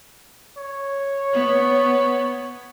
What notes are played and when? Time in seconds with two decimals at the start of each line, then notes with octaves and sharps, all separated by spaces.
0.58 C#5
1.33 B3